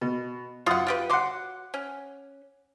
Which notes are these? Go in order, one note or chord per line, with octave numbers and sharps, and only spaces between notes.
B2
F#2 F4 F#5 D#6
F4 G4 B4
F#3 F#5 C6 D6
C#4